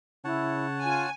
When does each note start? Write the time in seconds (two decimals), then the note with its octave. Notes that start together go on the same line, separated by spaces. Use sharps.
0.25 C#3 E4 C#5 F#5 A5
0.84 F4 G#5